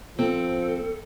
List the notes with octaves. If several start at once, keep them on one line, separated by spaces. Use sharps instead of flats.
F3 C4 A4